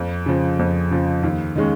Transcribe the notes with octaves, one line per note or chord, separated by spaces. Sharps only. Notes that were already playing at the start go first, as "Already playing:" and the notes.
Already playing: F2
C#3 F3
F2
C#3 F3
D#2
D#3 G#3 C#4